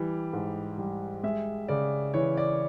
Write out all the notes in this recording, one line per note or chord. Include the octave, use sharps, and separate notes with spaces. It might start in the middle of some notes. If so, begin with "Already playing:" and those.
Already playing: E3 G3
G#2
G3
G#3 E5
C#3 D5
E3 C#5
D5